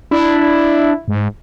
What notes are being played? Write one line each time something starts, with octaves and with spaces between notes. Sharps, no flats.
D4 E4
G#2